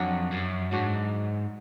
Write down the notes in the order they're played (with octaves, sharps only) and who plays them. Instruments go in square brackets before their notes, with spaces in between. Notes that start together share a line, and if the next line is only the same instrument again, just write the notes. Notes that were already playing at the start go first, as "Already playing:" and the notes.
Already playing: [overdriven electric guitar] F2 [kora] F#3 D4 F#4
[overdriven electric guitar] F#2
[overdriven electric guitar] G#2 [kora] F#3 D4 F#4